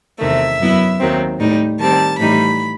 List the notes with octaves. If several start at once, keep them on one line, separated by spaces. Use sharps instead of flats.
E2 C3 D#3 A3 E5
F#2 F#3 B3 E4
D#2 D#3 F#3 C4
A2 G3 D#4
D#3 G3 C4 A5
A2 E3 G3 D#4 B5